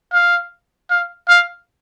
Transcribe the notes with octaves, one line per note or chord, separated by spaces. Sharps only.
F5
F5
F5